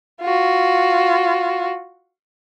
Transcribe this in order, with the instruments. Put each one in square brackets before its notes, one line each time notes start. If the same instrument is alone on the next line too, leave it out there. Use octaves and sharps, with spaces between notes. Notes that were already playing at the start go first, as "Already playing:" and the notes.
[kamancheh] F4 F#4